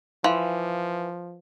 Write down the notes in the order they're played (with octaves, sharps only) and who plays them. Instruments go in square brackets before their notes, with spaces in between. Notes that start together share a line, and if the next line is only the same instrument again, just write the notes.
[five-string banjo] E3 [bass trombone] F3 [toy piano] F5 C6